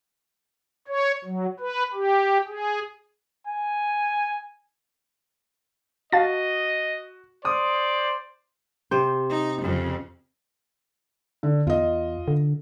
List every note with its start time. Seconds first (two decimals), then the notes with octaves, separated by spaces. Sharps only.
0.88 C#5
1.24 F#3
1.60 B4
1.94 G4
2.47 G#4
3.47 G#5
6.12 F#4 D#5 F5 A5 A6
7.45 C5 D5 D6 D#6
8.91 C3 C5
9.30 D#4
9.62 F2 C#3
11.43 D3
11.67 E2 F4 D#5
12.28 D3